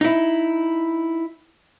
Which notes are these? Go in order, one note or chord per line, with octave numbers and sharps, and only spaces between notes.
D#4 E4